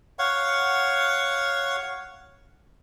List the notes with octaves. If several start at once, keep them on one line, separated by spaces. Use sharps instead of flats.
C#5 F5 F#5 C#6